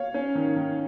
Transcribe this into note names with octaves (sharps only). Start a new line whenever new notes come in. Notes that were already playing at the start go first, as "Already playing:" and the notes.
Already playing: C#5 F5
C#4
D#3
D#3